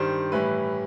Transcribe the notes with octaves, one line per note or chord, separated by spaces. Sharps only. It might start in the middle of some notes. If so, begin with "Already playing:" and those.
Already playing: G2 D#3 G3 C5
A2 E3 G3 B4